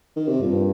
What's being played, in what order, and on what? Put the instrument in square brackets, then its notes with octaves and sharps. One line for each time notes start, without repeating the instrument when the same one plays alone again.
[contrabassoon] D#3
C3
[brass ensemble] G2 [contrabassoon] A#2